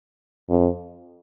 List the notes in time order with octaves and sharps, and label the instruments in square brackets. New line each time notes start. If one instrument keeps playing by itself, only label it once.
[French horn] F2